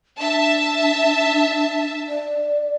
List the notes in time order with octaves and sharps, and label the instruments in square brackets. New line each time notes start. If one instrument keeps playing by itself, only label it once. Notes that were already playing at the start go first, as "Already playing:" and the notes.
[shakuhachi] D4 [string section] E5 A5
[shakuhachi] D5